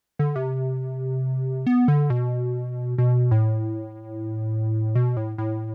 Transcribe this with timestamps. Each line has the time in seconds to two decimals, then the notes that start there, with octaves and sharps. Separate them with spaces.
0.19 D3
0.36 C3
1.67 B3
1.88 D3
2.10 B2
2.98 B2
3.31 A2
4.95 B2
5.17 A2
5.38 A2